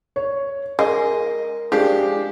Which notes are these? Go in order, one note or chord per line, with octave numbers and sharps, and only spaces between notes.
C#5
G#3 A#4 D#5
F3 G#3 D4 G4